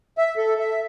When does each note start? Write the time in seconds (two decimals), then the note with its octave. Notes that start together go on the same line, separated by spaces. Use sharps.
0.18 E5
0.37 A4
0.59 E5